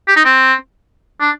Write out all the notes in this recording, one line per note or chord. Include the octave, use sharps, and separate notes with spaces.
G4
D#4
C4
D4